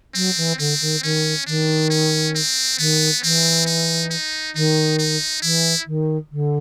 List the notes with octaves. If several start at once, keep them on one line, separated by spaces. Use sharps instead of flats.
F#3 C4
E3
D3 C4
D#3
D#3 C#4
D#3 D4
C#4
C4
D#3 B3
E3 C4
D#4
D#4
D#3 D#4
D#4
E3 E4
D#3
D3